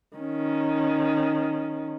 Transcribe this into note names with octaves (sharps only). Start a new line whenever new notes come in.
D#3 C#4